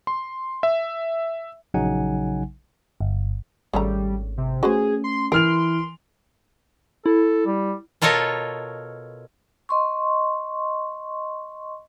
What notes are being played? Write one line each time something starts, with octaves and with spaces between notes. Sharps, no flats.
C6
E5
A#1 C#3 F#3 D#4 F#5 G#5
G1
G#1 C#3 G3 A3 A#5
C3
A3 C#4 F#4 G#4 B4 C5
C6
E3 A#4 C6 F6 D7 F7
E4 A4
G3
B2 F4 A4 A#4 C#5 D#5
D#5 C6 C#6